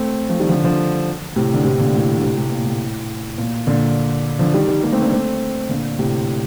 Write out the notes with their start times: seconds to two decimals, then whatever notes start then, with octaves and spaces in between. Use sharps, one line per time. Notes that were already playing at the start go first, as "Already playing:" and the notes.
Already playing: A3 C4
0.29 F3 A3
0.40 D#3 G3
0.49 D3 F3
0.64 D3 F3
1.36 A2 C3
1.54 D3
1.64 A2 C3
1.79 A#2 D3
1.94 A2
2.18 D3
2.23 A2 C3
2.37 A2 C3
2.52 A#2
2.66 A2
3.38 A#2
3.67 A#2 D3
4.39 D3 F3
4.54 D#3 G3
4.68 D#3 G3
4.83 G3 A#3
4.93 A3 C4
5.02 A#3 D4
5.12 A3 C4
5.69 A#2 D3
5.99 A2 C3